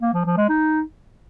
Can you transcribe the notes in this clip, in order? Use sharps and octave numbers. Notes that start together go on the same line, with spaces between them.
A#3
F3
F3
G#3
D#4